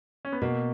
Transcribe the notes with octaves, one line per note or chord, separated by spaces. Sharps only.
C#4
B3
B2 A#3